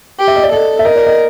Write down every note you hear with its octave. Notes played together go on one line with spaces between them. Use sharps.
G4
E5
D#5
D5
A4 D#5
E5
A#4 D#5
D5
D#5